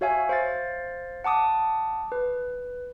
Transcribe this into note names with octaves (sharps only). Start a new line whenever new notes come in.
F#4 C#5 E5 F5 G#5
C5 F5 A6
F#5 A5 D6 D#6
B4